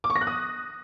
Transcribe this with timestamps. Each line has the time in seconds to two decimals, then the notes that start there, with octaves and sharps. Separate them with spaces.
0.04 D6
0.10 C#6
0.16 A#6
0.21 F#6
0.27 D#6